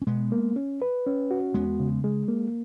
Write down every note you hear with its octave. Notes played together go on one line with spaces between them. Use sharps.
C#4
B2 G#3 B3
A#3
C#4
B4
C#4
F#4
E2 G#3 B3
C#3
G#3
A#3